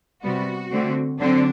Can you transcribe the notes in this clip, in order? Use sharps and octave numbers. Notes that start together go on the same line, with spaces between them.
C3 G3 B3 F#4
D3 A3 C4
D3 F#3 C4 D4